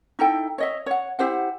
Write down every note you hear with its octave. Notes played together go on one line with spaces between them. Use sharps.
D#4 E4 A4 G5
C#5 D#5 E5
C#5 F#5
E4 G4 C5 F#5